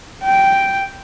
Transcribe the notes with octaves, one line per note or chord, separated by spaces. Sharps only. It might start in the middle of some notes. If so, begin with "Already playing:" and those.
G5